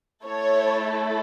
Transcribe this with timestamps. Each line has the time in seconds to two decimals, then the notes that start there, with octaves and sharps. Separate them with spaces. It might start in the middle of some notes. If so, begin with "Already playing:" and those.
0.24 A3 E4 A4 C#5